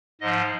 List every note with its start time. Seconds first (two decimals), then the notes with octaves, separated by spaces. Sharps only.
0.21 G#2 F3 D#5